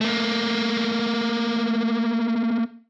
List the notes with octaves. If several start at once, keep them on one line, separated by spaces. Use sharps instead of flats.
A3 A#3